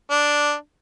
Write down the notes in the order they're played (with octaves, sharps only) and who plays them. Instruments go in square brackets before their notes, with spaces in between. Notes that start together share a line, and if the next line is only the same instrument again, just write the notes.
[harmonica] D4